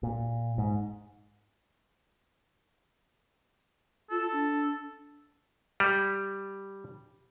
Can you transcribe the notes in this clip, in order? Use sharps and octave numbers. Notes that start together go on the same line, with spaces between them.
A#2
G#2
F4 A4
D4
G3